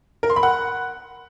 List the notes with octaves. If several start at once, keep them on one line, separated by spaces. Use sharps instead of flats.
A#4
C6
B5
F#5